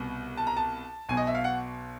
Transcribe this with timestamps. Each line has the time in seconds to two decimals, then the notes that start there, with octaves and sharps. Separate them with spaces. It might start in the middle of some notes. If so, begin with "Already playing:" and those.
Already playing: C2 B2
0.37 A5
0.47 A#5
0.57 A5
1.09 B1 B2 G#5
1.17 D#5
1.27 E5
1.35 F5
1.44 F#5